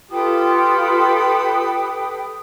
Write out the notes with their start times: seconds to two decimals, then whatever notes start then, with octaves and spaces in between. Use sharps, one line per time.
0.11 F4 G4 A4 B4 G5 D#6